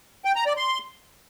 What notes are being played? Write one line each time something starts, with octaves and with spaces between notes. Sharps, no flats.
G5
A#5
D5
C6